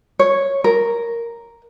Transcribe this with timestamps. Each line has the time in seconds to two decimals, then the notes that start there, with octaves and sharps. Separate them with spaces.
0.19 C#5
0.64 A#4